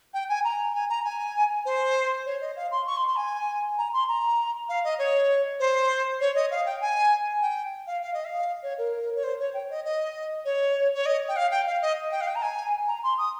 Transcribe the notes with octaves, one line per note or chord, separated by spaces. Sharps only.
G5
G#5
A#5
G#5
A#5
G#5
C5
C#5
D#5
F5
C6
C#6
C6
C6
G#5
A#5
C6
A#5
F5
D#5
C#5
C5
C#5
D#5
F5
G5
G#5
G5
F5
F5
D#5
F5
C#5
A#4
C#5
C5
C#5
G5
D#5
D#5
C#5
C#5
D#5
G5
F5
G5
F5
D#5
G5
F5
G5
A#5
G#5
A#5
C6
D#6